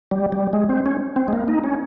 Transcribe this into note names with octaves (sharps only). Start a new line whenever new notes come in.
G3
G3
G#3
C4
C#4
C4
G#3
A#3
D#4
C#4